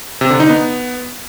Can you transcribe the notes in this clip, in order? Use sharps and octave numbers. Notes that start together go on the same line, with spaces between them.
C3
D3
D#4
B3